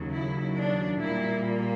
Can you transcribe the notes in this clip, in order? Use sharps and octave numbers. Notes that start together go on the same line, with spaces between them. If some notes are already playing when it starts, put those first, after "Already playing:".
Already playing: D#2 C#3 F#3
E4
D4
A#2 G3 A#3 E4
F4